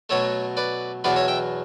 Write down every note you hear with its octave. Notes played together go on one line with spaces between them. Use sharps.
B2 F#3 A3 C#5 E5
B4 D5
E2 B2 F#3 B4 D5
C#5 E5
E5 G5